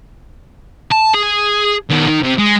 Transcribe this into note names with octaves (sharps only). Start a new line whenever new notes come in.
A5
G#4
D#3 B3
D#3
C3
G#3